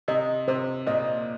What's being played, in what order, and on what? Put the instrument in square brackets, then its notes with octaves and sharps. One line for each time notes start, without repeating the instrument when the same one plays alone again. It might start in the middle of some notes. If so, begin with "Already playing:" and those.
[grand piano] C3 [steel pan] D#5
[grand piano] C3 [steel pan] C5
[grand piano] A#2 [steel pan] D#5